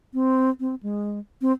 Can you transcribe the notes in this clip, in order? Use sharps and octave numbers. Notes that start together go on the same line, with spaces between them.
C4
C4
G#3
C4